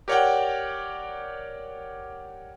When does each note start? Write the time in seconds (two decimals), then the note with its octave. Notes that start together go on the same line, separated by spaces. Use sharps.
0.08 G4 A#4 C#5 D5 F#5 G5